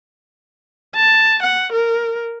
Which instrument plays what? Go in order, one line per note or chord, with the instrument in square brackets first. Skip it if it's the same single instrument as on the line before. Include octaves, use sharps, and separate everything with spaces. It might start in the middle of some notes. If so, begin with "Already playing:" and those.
[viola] A5
F#5
A#4